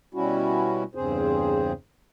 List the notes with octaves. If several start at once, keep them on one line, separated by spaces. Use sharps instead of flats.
B2 G3 C#4 E4 F#4
E2 G2 C#3 C4 G#4 C5